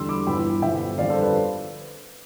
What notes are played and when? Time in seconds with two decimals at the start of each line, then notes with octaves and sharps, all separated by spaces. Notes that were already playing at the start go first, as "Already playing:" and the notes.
Already playing: E2 D3 G3 D4 C6 E6
0.09 B5 D6
0.27 G1 G2 E3 G5 B5
0.62 G2 D3 F3 B3 E5 G5
0.98 F2 D3 G3 D5 F5
1.10 A4 C5
1.22 B4